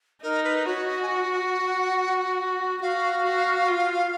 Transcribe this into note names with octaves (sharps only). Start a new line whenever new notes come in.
D#4 A#4
B4
F#4 C#5
D#5
G#5
F#5
F#4 F5
F#4
F4